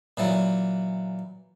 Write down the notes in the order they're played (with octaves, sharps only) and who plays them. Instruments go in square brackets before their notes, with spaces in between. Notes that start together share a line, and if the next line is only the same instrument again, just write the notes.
[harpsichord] A#2 E3 F#3